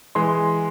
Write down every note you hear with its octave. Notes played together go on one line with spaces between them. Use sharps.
E3 G#3 C6